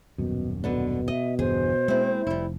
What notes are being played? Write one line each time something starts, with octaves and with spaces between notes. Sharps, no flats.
D#1 F#2 B2
B2 D3 B3 D4
D#5 E5
G1 E2 G2 G#4 C5
G#3 A#3 C4 E4
F1 G3 E4